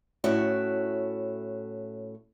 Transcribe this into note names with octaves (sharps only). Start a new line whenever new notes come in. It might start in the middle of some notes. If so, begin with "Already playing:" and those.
A2 C#4 F#4 E5